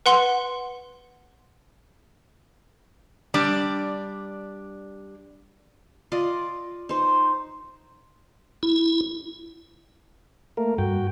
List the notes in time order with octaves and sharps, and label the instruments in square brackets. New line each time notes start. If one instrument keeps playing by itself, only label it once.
[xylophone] B4 F#5 C6
[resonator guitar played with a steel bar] G3 D4 D5
[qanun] F4 D5 D#5
D#4 C5
[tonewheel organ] E4
A3 A#3 A#4
[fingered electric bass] G2 [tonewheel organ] F#4 G5